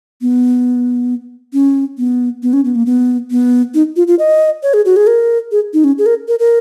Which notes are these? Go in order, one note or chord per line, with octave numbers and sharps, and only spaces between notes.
B3
C#4
B3
B3
C#4
B3
A#3
B3
B3
D#4
F4
F4
D#5
C#5
G#4
F#4
G#4
A#4
G#4
D#4
C#4
G#4
A#4
A#4
A#4